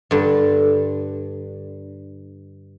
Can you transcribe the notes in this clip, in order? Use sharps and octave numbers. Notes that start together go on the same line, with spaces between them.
G2 D3